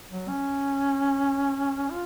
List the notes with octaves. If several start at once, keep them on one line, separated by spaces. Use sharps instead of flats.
F#3
C#4
F4